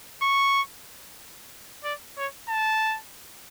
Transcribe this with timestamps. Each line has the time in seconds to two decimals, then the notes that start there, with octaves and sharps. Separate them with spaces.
0.22 C#6
1.84 D5
2.17 C#5
2.49 A5